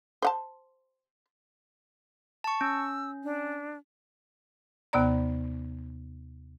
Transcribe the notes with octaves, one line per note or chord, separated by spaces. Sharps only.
C5 F#5 A5
A5 C#6
C#4 E6
D4
D#2 C3 B3 D5 A#5